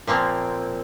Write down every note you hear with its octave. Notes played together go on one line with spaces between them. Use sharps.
A#2 F3 A#3 C4